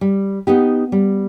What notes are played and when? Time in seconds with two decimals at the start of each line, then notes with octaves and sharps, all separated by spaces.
0.01 G3
0.47 B3 D#4 G4
0.92 G3